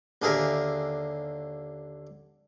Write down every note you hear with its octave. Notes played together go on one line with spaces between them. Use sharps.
D#2 D3 G#4 A#4 E5